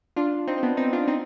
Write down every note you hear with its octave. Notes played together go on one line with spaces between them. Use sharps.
D4 F4
C4 D#4
C4
B3 D4
C4 D#4
D4 F4
C4 D#4